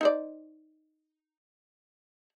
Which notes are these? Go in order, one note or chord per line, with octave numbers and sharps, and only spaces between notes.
D#4 C5 D5